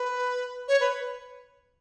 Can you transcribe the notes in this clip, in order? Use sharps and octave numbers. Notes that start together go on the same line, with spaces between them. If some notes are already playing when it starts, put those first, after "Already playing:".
Already playing: B4
C#5
B4